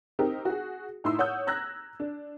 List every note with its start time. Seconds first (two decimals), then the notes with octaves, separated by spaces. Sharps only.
0.19 C4 D#4 G4 A#4
0.45 F#4 G#4
1.04 A2 D#4 E4 C6 E6
1.19 C#5 F#5 D#6 E6 G6
1.47 A#5 E6 F#6 G#6 A#6
2.00 D4